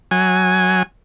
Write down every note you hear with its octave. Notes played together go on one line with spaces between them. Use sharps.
F#3 G#5